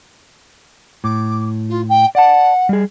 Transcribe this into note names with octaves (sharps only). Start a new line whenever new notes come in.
A2 D6
F4
G5
D5 F#5 A5
G3 G#4